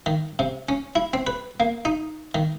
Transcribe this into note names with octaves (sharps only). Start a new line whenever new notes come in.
D#3
C3
C#4
E4
C4
B4
A#3
D#4
D#3